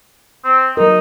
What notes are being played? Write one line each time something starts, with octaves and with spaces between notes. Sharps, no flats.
C4
F#3 D#4 A#4